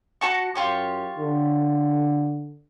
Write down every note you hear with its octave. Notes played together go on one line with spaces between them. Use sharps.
F#4 A5 C#6
F#2 F4 G4 C#5
D3